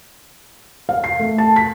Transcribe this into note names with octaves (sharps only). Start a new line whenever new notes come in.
F5
C7
A3
A5
B6